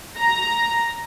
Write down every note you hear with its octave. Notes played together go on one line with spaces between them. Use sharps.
A#5